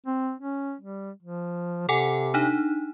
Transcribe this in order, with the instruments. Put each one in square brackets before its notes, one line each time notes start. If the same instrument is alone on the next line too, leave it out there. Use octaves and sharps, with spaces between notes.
[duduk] C4
C#4
G3
F3
[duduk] C3 [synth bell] A4 F#5 G#5
[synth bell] D4 D#4